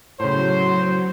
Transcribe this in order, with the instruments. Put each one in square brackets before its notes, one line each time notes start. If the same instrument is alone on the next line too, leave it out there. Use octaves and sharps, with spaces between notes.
[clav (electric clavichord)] A2 C#3 [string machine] F#3 [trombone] C5 [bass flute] C#5